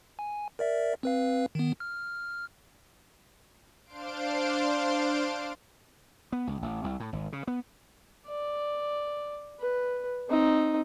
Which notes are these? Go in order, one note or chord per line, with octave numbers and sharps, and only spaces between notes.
G#5
A#4 D5 E5
C4 B4 F5
D#3 B3
F6
D4 C5 F5 C6 D7
B3
C#2
A1
C2
A2
G#1
C#3
B3
D5
B4
C4 D#4